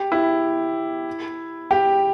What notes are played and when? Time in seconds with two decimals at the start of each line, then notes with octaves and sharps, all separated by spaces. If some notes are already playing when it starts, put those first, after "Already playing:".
Already playing: G4
0.12 E4
1.71 G4